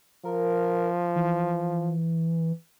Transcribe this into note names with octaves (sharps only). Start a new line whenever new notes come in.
F3 A#4
E3